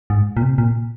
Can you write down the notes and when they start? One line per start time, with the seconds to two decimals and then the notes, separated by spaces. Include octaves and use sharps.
0.10 G#2
0.37 A#2
0.42 C3
0.58 A#2